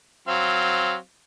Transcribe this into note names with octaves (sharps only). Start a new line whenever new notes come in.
F#3 C4 F5